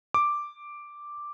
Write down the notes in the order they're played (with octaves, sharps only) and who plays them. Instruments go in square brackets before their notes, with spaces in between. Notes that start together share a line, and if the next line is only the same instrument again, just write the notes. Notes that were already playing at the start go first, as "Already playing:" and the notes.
[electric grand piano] D6